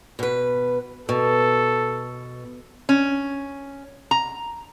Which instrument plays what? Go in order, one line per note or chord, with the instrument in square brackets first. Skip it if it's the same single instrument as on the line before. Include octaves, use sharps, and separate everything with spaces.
[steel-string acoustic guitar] B2 B4
[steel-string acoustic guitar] B2 [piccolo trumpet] A4
[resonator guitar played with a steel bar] C#4
A#5